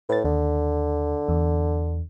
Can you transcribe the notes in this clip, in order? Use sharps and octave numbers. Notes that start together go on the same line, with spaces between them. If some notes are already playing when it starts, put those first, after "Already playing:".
A2 B4 A6
D#2 D3
E2